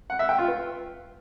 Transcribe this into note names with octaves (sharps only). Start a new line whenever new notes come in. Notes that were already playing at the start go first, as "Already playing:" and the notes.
F#5
E5
G5
F4
B4